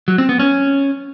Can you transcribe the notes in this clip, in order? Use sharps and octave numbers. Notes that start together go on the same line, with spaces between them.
F#3
C4
B3
C#4